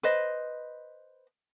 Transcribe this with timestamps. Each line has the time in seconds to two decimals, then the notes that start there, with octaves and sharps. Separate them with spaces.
0.03 B4 C5 D#5